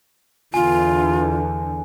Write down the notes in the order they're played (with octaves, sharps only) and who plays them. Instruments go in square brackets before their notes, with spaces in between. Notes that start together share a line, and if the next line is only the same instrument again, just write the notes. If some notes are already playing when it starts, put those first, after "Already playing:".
[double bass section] E2 D3 [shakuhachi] F4 [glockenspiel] G#5